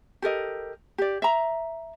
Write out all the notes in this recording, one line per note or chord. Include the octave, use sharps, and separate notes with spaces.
G4 A4 A#4 D#5
G4 D5
E5 A#5